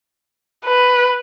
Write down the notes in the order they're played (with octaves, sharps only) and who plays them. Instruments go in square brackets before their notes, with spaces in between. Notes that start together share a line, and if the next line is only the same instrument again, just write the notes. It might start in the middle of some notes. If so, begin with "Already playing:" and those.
[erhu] B4